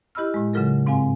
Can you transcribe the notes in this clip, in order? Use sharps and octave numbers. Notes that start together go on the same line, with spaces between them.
E4 G4 D#5 B5 E6 F6
A2 G#3
C#3 F#3 G#3 F4 A4 A#4
G#2 C4 F5 G#5